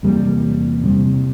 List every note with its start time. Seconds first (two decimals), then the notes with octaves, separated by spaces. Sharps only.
0.03 E2 C3 G3 A#3
0.84 C3 G3 C4